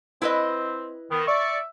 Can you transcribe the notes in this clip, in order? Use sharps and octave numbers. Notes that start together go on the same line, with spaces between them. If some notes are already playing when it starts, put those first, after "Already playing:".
C4 E4 B4 D#5
D#3 B3
D5 E5 C#6